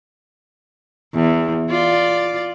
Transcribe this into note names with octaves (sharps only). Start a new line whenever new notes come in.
E2
F4 D5